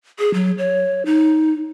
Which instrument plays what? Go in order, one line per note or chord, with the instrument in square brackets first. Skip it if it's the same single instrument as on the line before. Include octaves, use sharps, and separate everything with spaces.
[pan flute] G#4
F#3
C#5
D#4